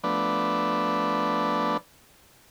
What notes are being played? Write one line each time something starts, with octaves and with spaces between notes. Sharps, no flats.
F3 A3 B3 D4 B4 D5